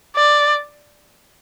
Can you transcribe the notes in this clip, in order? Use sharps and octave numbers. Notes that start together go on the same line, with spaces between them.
D5